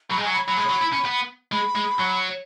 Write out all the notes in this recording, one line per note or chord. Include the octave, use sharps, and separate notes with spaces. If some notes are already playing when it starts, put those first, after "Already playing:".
F#3 B5
G#3
G#5
F#3
B5
F#3 B5
G#3
F#3
E4
C#4
B3
G#3 B5
G#3
F#3